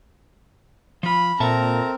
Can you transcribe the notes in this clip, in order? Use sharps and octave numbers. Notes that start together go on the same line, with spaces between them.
F3 F4 B5
A#2 C4 A4 A#4 E5 A5 A#5